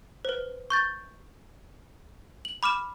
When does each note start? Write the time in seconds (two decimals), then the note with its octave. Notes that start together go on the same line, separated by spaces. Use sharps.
0.25 B4 C5
0.70 C#6 G6 A6
2.45 F#7
2.63 B5 D6 F6 E7